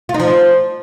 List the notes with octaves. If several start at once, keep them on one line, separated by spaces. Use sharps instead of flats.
F4
D#4
F3